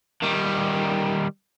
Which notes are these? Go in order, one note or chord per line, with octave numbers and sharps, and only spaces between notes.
D#3 G3